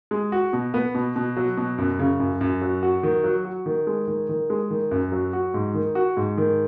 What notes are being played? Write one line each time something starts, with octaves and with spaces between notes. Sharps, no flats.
G#3
F#4
B2
B3
B2
B2
F#3
B2
F#2
C#3
F#2
F#2
F#3
F#4
D#3
F#3
F#4
D#3
G#3
D#3
D#3
G#3
D#3
F#2
F#3
F#4
G#2
D#3
F#4
G#2
D#3